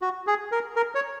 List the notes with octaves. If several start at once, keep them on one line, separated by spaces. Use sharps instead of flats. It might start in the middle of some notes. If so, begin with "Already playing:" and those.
F#4
G#4
A#4
A#4
C#5